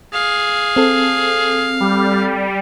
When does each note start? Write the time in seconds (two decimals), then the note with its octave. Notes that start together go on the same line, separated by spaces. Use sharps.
0.13 G#4 F5
0.76 C4 A4
1.80 G3